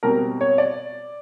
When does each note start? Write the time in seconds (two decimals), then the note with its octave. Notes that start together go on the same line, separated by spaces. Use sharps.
0.03 B2 G3 C4 A#4
0.41 C#5
0.58 D5